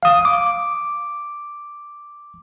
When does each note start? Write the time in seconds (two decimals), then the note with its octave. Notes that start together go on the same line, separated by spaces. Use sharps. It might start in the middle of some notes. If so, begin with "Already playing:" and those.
0.03 F5 D#6
0.25 D6